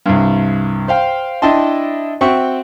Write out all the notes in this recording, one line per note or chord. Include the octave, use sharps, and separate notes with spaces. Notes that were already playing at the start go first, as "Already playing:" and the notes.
C2 G2
C5 F5 G5
D4 E4 D#5 G5 A5 C6
C4 F#4 E5 G5 C#6